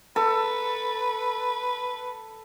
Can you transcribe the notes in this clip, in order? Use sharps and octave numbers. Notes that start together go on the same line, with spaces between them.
A4 B4